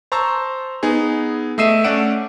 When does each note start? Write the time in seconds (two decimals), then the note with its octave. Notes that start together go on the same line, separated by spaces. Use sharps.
0.12 C5 A5 A#5 C#6 E6
0.83 B3 D#4 G#4
1.58 A3 D#5 E5 C7 D#7 E7
1.84 A3 C#4 D5 F#5 D7 E7